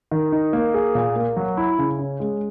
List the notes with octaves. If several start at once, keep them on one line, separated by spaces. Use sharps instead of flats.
D#3
D#4
A#3
G#4
A#2
A#3
F#3
E4
C#3
C#4
G#3